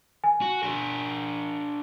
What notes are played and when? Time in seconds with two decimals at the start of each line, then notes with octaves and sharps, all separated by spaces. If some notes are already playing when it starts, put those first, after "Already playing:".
0.24 G#5
0.42 F#4
0.63 D4 A#4